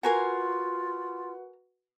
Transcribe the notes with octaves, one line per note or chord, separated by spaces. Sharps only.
F4 F#4 A#4 B4 F#5 G#5 A#5